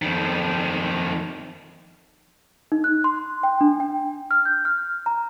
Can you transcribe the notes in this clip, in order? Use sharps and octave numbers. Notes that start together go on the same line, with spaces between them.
F2 D#3
D#4
F#6
C6
G5
D4
G5
F6
G6
F6
A#5